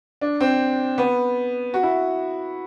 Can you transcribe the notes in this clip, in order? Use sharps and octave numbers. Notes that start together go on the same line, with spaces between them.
D4
C4
B3
F#4
E4